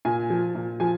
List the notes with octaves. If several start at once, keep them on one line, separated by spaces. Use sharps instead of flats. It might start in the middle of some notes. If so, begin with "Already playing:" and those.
A#2 G#5
F3
A#2
F3 G#5